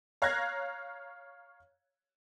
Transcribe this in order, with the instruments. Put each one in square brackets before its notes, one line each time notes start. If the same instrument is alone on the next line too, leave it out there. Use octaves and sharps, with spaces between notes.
[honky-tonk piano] C#5 F5 A#5 F#6 G#6 A#6